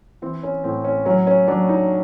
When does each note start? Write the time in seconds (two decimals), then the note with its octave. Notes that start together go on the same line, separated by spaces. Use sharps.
0.22 E3 C4
0.43 C#4
0.64 A2 C4
0.84 C#4
1.05 F#3 C#4
1.27 C#4
1.48 F#3 D4
1.69 D#4